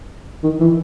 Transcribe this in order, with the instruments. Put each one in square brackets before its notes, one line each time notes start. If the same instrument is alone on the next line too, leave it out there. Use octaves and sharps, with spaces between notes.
[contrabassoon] D#3
E3